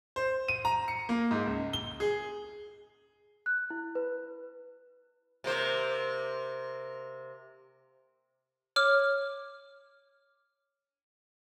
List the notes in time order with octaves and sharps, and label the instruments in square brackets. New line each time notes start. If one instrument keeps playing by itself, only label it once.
[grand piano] C5
D#7
A#5
C#7
A#3
G#2
C#2
G7
G#4
[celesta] F#6
E4
B4
[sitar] C3 A#3 C5
[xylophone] C#5 D6 F6